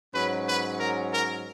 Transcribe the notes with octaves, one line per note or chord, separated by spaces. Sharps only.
G#2 F#3 C#4 B4
B4
A#4
A#4